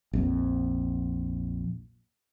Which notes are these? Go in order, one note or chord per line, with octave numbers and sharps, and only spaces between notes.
A#1 F2